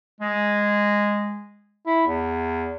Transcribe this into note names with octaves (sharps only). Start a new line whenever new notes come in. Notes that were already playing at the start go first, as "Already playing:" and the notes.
G#3
E4
E2